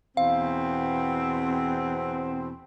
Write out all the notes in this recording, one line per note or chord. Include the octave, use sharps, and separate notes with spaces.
E2 B2 C4 F5